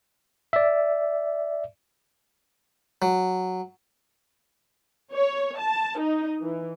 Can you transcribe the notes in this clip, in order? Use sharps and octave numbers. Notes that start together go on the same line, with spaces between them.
D5 E5
F#3
C#5
A5
D#4
E3